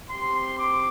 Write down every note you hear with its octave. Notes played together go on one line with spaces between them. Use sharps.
C4 G4 C6
D6